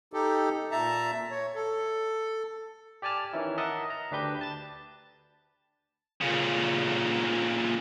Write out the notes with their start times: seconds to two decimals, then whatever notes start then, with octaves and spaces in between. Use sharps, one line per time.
0.13 D#4 G4 A4
0.71 A#2 E5 A5 A#5
1.31 C#5
1.55 A4
3.02 G4 D5 G#5 A5 F6
3.33 D#3 E3 C#4 D#4 E4
3.58 A#4 D#5 E5 F#5 A5
3.90 A#5
4.11 D2 D4 G4 B4 G6
4.41 A5 A6
6.21 A#2 C#3